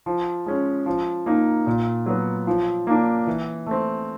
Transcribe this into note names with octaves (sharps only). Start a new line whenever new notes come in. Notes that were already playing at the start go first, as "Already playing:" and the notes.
F3
G#3 C#4
F3
A#3 D#4
A#2
F#3 B3
F3
A#3 D4
E3
A3 C4